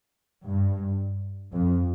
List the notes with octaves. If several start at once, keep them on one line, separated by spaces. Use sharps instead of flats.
G2
F2